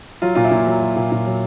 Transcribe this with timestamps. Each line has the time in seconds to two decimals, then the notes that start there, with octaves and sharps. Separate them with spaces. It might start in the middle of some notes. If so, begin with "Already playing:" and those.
0.22 F#3 F4
0.35 A#2 F4
0.44 E4
0.51 A#2
0.67 F#3
0.81 F#3
0.96 A#2
1.12 A#2
1.26 F#3